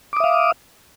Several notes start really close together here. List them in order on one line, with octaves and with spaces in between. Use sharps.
D6 D#6 E5 F5